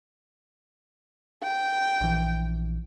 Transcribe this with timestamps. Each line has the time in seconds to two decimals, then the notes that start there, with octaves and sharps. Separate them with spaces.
1.43 G5
2.01 A#1 E3